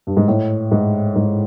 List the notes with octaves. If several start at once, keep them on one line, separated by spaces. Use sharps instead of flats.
G2
G#2
A2
G#2
G#2